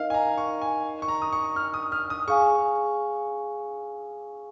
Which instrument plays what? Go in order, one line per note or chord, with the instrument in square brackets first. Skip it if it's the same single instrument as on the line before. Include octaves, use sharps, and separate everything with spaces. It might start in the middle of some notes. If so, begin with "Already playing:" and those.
Already playing: [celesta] D#4 A#4 D#5 [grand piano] F5
[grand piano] G#5
A#5
C#6
G#5
C#6
A#5
D#6
C#6
F6
D#6
F6
D#6
[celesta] G#4 F5 G#5 [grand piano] C#6